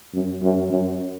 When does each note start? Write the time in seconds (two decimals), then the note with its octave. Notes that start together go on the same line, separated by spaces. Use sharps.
0.14 F#2
0.42 F#2
0.71 F#2